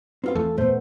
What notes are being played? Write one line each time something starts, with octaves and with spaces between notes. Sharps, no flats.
B3 C4 F4 F5
E2 E3 A3 A4
E2 A#2 A3 B3 C5